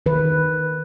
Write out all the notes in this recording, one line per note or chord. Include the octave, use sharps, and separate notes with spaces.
D#3 B4